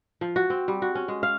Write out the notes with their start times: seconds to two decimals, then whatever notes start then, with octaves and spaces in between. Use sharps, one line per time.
0.21 F3
0.36 F#4
0.50 C4
0.68 G3
0.82 F#4
0.95 C#4
1.08 G#3
1.23 F5